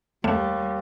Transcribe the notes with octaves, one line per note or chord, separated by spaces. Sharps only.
D#2 G3 A3